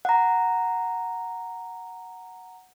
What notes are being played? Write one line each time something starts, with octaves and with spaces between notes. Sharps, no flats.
F#5 A#5